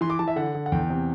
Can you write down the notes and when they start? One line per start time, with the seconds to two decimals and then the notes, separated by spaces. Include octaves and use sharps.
0.01 E3 C6
0.10 D6
0.19 E3 A5
0.28 E5
0.36 D3 F#5
0.55 D3
0.66 F#5
0.72 E2 G5
0.90 C3